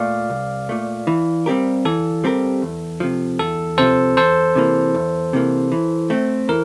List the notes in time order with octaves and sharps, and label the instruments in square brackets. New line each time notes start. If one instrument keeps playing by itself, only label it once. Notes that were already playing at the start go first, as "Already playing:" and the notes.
Already playing: [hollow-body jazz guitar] A#2 A3 [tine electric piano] D5 F5
[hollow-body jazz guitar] C2
A#2 A3
E3
G3 C4 G4 A#4
[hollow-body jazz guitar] E3 [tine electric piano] A4
[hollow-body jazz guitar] G3 C4 G4 A#4
E2
C3 F3
[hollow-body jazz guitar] E2 [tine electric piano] A4
[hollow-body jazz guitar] C3 F3 [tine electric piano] A4 C5
[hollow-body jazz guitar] E2 [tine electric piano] A4 C5
[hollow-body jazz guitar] C3 E3 A#3
E2
C3 E3 A#3
E3
A3 C4
[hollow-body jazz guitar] E3 [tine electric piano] A#4